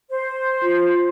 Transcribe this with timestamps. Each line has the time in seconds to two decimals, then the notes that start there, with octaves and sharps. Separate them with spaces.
0.10 C5
0.62 F4